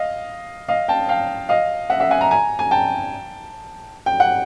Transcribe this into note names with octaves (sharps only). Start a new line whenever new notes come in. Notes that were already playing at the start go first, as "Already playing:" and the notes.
Already playing: D#5 F5
D#5 F5
G5 A5
F5 G5
D#5 F5
E5 F#5
E5 F#5
F#5 G#5
G#5 A#5
G#5 A#5
G#5
G5 A5
G5
F#5